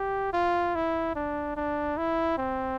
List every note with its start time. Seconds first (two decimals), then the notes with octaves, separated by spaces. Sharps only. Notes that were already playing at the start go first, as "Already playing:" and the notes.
Already playing: G4
0.33 F4
0.75 E4
1.15 D4
1.56 D4
1.97 E4
2.38 C4